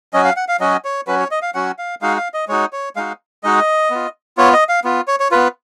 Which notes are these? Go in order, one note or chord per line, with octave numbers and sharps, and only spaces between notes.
F#3 C#4 F#4 D#5
F5
F#5
F5
F#3 C#4 F#4 D#5
C#5
F#3 C#4 F#4 B4
C#5
D#5
F5
F#3 C#4 F#4 F#5
F5
G#3 D#4 F#4 F5
F5
D#5
G#3 D#4 F#4 C#5
C#5
G#3 D#4 F#4 F5
G#3 D#4 F#4 D#5
B3 F4
B3 F4 C#5
D#5
F5
B3 F4
C#5
C#5
B3 F4 B4